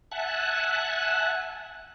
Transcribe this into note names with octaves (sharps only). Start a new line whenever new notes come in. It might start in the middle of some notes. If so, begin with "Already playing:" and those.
E5 F#5 G#5 A5 F#6